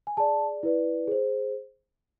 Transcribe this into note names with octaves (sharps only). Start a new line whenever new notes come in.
G#5
G#4 D5 A5
E4 B4 D5
G#4 C5